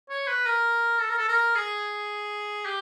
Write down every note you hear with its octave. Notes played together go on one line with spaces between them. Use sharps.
C#5
B4
A#4
A4
A#4
A4
A#4
G#4
G4